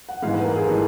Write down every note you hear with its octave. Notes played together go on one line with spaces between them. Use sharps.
F#5
G#2 E3 G#3 F5
B4
A#4
G#4
E3 G#3 A4